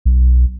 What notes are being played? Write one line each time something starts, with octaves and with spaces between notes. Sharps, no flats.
B1